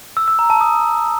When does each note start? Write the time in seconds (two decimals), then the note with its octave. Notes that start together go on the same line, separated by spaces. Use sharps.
0.17 E6
0.28 E6
0.39 A#5
0.50 A5
0.61 D#6